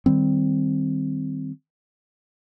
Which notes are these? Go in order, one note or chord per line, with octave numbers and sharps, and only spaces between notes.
D#3 G3 C4